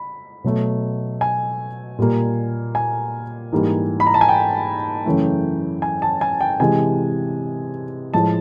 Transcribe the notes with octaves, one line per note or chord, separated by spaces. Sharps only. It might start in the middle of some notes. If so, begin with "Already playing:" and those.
Already playing: B5
B2 F#3 A3
G#5
A#2 G3 A#3
G#5
G#2 E3 G3 A#3
B5
A#5
A5
G#5
G5
F#2 C#3 E3 A3
G#5
A5
G#5
G5
C3 E3 G#3 G#5
A2 F3 G#3 A5